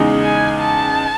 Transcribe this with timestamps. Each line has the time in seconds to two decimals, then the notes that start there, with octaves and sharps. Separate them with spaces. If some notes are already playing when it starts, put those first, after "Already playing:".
Already playing: E2 C#3 G#3 D#4 G#4
0.23 G#5
0.60 A5